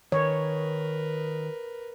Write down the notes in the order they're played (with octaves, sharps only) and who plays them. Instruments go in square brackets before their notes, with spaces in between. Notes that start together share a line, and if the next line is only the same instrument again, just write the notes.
[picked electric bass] D#3 [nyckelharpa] A#4 B4 [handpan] C#5